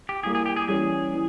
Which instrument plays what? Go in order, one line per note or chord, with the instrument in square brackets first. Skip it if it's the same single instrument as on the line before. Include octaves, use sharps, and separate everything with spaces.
[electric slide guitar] G4
[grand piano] G3 A#3 E4 [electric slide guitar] G#4
[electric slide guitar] G#4
G4
G#4
[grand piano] E3 G3 C#4 [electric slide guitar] G#4
[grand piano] E3